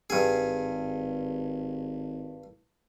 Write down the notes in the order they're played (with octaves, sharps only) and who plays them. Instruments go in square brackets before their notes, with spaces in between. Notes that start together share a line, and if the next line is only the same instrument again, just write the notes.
[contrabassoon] G#1 [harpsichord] G2 G#4